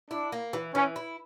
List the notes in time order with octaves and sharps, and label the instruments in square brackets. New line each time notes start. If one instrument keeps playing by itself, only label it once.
[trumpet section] D4 [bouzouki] E4
[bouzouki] A#3
E3
[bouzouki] E3 [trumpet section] C#4
[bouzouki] E4